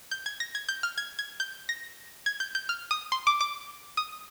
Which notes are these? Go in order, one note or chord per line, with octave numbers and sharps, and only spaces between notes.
G6
G#6
A#6
G#6
G6
F6
G#6
G#6
G6
A#6
G#6
G6
G6
F6
D#6
C6
D6
D6
D#6